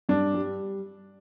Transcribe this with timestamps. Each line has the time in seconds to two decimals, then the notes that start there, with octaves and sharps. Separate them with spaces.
0.09 G2 D4
0.34 G3